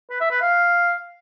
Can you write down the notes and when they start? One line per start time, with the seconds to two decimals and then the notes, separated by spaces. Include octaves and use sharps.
0.10 B4
0.21 E5
0.31 B4
0.42 F5